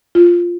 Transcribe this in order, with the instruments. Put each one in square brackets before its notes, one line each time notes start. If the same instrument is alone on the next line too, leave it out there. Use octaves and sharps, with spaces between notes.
[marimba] F4